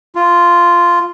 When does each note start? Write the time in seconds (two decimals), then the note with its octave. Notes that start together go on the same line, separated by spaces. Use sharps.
0.15 F4